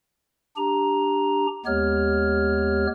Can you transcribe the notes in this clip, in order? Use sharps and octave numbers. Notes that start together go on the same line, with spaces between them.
D4 G4 A#5
D#2 G#3 B3 G4 C#5 F6